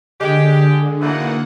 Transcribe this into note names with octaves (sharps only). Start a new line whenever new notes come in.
D3 G#3 G4 G#4
G#2 B2 E3 A#3 F#5